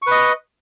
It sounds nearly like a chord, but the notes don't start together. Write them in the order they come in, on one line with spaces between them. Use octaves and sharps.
C#6 B4 D#5